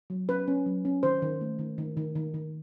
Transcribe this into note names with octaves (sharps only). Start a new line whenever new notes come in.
F#3
C#4 B4
C#4
F#3
C#4
D#3 C5
D#3
A3
D#3
D#3
D#3
D#3
D#3